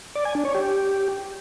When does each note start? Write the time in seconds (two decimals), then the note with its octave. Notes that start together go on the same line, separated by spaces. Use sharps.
0.15 D5
0.25 G#5
0.35 D4
0.45 C#5
0.55 G4